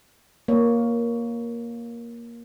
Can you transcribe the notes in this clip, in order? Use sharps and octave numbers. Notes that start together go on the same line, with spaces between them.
A#3 C#5